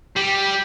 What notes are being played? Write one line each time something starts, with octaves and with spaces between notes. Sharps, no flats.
G3